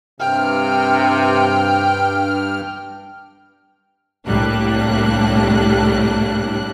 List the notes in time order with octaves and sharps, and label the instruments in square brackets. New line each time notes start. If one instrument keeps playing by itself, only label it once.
[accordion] G2 F6 [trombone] C3 [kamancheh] G5
[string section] C2 A2 G3 A#3 D4 F#6